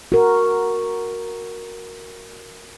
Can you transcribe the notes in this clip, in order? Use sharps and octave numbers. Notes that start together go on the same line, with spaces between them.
F#4 A#4